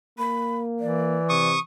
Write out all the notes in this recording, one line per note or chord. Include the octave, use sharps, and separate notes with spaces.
A#3 B5
E3 D5
C3 C#6 D#6